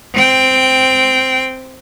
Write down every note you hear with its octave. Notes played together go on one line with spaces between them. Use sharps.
C4 G5